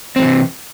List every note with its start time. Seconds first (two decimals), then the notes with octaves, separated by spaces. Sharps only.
0.16 C4
0.19 G3
0.22 E3
0.25 C3